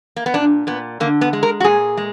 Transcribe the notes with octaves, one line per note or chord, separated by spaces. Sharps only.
A#3
B3
A#2 D4
A#2 B3
D3 A#3
B3
G#3
A#4
F#4
A#2 G#4
G#3